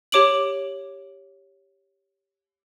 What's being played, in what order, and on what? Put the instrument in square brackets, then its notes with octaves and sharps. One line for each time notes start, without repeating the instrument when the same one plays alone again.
[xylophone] G4 C#5 D6 D7 F#7